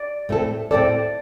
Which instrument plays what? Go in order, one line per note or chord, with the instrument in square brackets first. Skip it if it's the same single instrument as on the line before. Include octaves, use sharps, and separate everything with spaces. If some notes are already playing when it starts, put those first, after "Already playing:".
Already playing: [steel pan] D5
[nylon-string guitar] A2 A3 C4 A4
[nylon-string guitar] A2 A3 C4 A4 [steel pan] D5